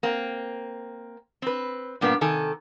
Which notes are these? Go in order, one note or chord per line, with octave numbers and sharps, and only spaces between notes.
A#3 C4
C4 B4
G2 A#2 A#3 B3 D4
C3 D#3 A4 G#5